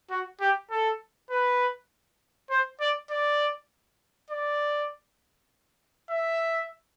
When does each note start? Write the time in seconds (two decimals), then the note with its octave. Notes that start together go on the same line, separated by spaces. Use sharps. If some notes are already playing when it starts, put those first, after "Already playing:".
0.11 F#4
0.41 G4
0.71 A4
1.30 B4
2.50 C5
2.80 D5
3.10 D5
4.30 D5
6.10 E5